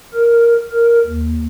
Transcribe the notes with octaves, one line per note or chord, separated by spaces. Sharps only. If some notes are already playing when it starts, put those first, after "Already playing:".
A#4
A#4
D#2